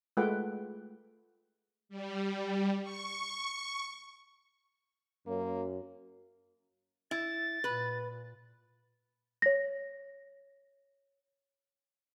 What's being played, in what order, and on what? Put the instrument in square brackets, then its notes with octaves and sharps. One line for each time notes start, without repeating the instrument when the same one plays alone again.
[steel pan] G#3 A3 F4 B4 F#5 G5
[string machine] G3
C#6
[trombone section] F#2 [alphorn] A#3
[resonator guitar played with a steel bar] E4 [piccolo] A6
[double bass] A#2 [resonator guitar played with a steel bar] B4
[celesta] C#5 A#6